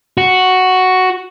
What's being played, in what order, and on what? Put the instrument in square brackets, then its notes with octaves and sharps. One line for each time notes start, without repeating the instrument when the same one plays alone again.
[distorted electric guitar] F#4